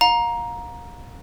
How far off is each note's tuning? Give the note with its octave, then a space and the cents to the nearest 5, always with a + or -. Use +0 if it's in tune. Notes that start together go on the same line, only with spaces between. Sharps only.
F5 +35 A#5 +10